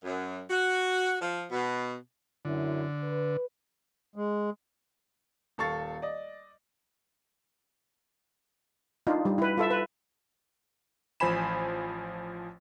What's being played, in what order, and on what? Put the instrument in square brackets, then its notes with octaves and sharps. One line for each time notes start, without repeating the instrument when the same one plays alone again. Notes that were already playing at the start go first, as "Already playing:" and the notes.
[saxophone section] F#2
F#4
F3
B2
[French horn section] F#2 E4 [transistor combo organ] D3
[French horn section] B4
[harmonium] G#3
[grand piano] D#1 A4 F5 C#6 A6
D5 D#5
[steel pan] D4 D#4 F4
G3
E4 B4
F4 A4 E5
B4
[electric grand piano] A1 F3 C5 G#5 B5 E7